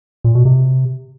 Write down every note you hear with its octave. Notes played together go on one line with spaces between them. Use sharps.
A#2
B2
C3